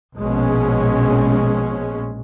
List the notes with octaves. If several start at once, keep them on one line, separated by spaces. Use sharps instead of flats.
A#1 B2 G#3 C#4